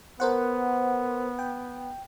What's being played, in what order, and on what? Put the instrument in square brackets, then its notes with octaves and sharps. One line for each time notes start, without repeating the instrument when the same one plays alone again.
[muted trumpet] B3 [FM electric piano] A#4 C5 F#5
[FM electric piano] G5